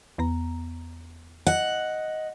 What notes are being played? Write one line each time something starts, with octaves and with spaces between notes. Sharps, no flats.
E2 B3 A#5
D#5 F#5